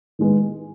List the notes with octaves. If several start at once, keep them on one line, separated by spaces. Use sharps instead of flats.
D#3 G#3 B3